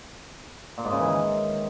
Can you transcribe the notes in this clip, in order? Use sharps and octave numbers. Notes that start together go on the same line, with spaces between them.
A#2
G#2
C#3
E3
D#3